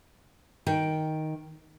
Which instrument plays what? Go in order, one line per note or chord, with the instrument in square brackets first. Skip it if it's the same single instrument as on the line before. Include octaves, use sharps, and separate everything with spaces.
[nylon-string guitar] D#3 G5